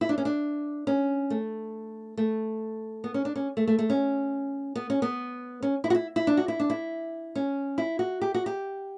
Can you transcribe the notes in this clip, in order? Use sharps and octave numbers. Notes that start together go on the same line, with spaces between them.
E4
D4
C#4
D4
C#4
A3
A3
B3
C#4
D4
C#4
A3
A3
A3
C#4
B3
C#4
B3
C#4
E4
F#4
E4
E4
D4
F#4
E4
D4
E4
C#4
E4
F#4
G4
F#4
G4